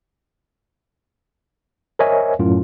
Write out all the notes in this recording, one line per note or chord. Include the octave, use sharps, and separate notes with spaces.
A#4 C5 C#5 D#5 E5 G#5
F#2 A2 F4